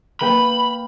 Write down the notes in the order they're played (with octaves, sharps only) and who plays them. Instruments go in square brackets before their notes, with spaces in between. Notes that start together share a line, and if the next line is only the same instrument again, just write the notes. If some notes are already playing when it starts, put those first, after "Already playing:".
[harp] A#3 B4 G5 [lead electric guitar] B5